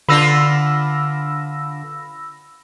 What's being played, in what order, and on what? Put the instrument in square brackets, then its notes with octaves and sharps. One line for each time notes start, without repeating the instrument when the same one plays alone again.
[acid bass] D3 [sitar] D4 F4 B4 [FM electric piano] B5 E6 A#6